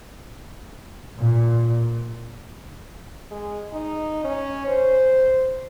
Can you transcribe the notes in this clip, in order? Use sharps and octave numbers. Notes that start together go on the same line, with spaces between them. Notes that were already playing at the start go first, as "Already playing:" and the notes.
A#2
G#3
D#4
C#4
C5